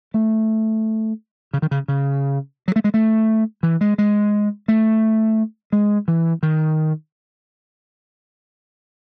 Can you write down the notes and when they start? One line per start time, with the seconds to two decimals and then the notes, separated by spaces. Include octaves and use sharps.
0.14 A3
1.54 C#3
1.62 D#3
1.71 C#3
1.88 C#3
2.68 F#3
2.76 A3
2.84 G#3
2.94 A3
3.63 E3
3.81 G#3
3.98 G#3
4.68 A3
5.72 G#3
6.08 E3
6.43 D#3